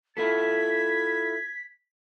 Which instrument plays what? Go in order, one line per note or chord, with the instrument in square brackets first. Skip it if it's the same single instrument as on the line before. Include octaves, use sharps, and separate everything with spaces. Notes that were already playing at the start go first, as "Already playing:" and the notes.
[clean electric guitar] E4 F4 A4 [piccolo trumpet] G#6 [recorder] B6